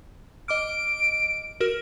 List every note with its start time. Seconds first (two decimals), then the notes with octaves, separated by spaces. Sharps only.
0.48 D#5 D6 F6 D7
1.61 F#4 A#4 F6